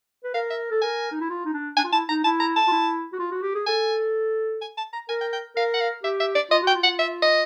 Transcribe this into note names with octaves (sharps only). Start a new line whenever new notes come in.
B4
A#4 F5
E5
A4
A#4 G#5
D#4
E4
F4
D#4
D4
D4 G#5
F4
E4 A5
D#4 A#5
E4 A5
A#5
A5
F4
E4
F#4
F4
F#4
G4
G#4
A4 G#5
G#5
A5
A#5
A#4 G#5
G5
G5
A#4 F5
F#5
F5
G4 E5
E5
D5
F4 D#5
F#4 G5
F4
F#5
E5
D#5